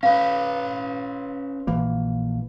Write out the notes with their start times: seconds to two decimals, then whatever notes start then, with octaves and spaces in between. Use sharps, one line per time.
0.03 C#4 B4 F5
1.67 A#1 E3 A#3